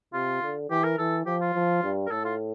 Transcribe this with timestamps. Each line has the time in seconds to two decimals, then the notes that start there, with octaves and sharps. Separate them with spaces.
0.13 C3 F4
0.42 D3
0.70 E3 G4
0.84 A#4
0.98 E3 A4
1.26 F3 G4
1.41 F4
1.55 F3
1.83 G2
2.06 A#4
2.10 A2 A4
2.24 F4